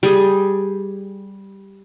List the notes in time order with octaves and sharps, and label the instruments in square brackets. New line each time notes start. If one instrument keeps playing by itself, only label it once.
[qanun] G3 G#4